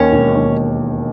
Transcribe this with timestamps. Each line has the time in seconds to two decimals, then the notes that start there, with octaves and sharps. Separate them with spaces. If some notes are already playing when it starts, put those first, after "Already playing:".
Already playing: D#2 D#3 C#4
0.13 E1
0.34 D#2 D#3